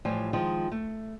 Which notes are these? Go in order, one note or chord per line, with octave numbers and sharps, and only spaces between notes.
A2 E3 F3 G3
D#3 F3 G#3 F4
A3